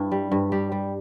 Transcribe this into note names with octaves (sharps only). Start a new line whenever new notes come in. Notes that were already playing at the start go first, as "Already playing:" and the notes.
Already playing: G2 E4
G3
G2
G3 G4
G3